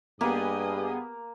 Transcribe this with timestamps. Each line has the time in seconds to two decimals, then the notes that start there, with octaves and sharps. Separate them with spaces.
0.21 G2 A#3 B3 G4 G#4 D#5 G#5